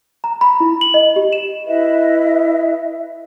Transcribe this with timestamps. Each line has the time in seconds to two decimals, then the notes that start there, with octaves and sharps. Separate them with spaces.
0.24 A#5
0.41 B5
0.60 E4
0.81 F#7
0.94 D#5
1.16 G4
1.33 E7
1.67 E4 B4 D#5 E5